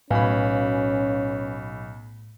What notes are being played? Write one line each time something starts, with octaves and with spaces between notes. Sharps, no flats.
B1 A2 C#4 F#4 B4 F5 G#5 B5